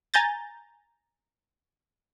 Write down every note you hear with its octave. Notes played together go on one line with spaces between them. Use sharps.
G#5 A#5 G6 A6